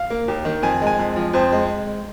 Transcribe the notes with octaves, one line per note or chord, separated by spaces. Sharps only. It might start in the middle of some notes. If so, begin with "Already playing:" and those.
Already playing: F5
A#3
D#2
D#3
F2 G#5
G#3
G#5
F2
F3
F2 C5
G#3